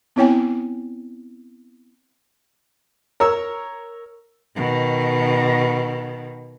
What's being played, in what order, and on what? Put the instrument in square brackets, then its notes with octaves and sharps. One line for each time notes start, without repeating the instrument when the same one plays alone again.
[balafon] B3 C4 E4 C#5 G5 G#5
[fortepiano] A#4 C#5 E6
[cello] B2 D#3